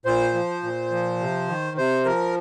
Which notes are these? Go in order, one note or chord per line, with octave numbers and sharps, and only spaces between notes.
A#2 C5
F3
A#2
F3
C3
D#3
C3 C5
F3 A#4